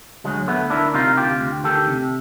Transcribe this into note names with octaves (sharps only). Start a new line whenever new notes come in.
D2 F#3 G#3
D2 A3 B3
D#3 D4 E4
C3 D#4 F4
D2 F4 G4
D2
D#3 G4 A4
C3